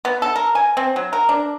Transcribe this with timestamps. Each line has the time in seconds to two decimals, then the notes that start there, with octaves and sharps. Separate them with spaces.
0.05 B3
0.22 A4
0.36 A#4
0.55 G#5
0.77 C4
0.96 F#3
1.13 A#4
1.29 D4